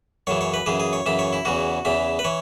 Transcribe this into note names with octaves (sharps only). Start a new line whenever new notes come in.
F#2 C#3 E3 C#5
C#5
B4
F#2 C#3 E3 G#4
G#4
C#5
F#2 C#3 E3 E5
C#5
E4
E2 C#3 E3 F#4
E2 C#3 E3 E5
B4
E3 C#5